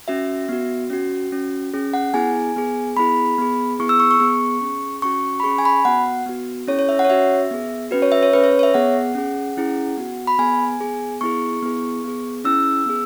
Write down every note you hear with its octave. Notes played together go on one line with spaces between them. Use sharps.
C#4 F#4 E5
B3 F#4
C#4 F#4
C#4 F#4
C#4 G#4
F#5
B3 E4 G#4 G#5
B3 G#4
B3 E4 G#4 B5
B3 G#4
B3 E4 G#4 C#6
E6
C#6
C#6
B3 G#4
C#4 G#4
C#4 F#4 C#6
B5
C#4 G#4 C#6
G#5
B5
B3 F#4 F#5
B3 F#4
C#4 E4 G#4 C#5
C#5
E5
F#5
C#5
C#4 F#4 E5
B3 G#4
C#4 F#4 B4
C#5
E5
C#5
C#4 G#4 B4
C#5
C#5
E5
B3 G#4 F#5
C#4 G#4
C#4 E4 G#4
B3 F#4
B5
B3 G#4 G#5
B3 G#4
B3 E4 G#4 C#6
B3 E4 G#4
B3 G#4
C#4 E4 G#4 E6
B3 G#4